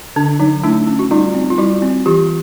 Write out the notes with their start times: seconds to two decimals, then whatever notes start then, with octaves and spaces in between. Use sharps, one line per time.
0.16 D3 D4
0.40 F#3 D#4
0.63 A3 D4 E4
0.87 C#4
0.99 F#4
1.11 G3 D#4 F4
1.35 C4
1.50 F4
1.58 G3 E4 F#4
1.82 C4
2.06 E3 F4 G4